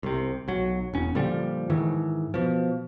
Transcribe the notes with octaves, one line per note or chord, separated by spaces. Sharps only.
C2 C3
B1 F#3
E1 C#4
A#2 D3 F3 G3
G#2 D#3 E3
B2 F3